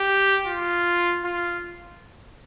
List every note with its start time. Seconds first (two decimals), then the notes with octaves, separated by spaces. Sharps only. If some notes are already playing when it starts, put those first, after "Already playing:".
Already playing: G4
0.47 F4
1.24 F4